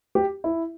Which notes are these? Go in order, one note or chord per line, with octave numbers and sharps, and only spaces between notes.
G4
E4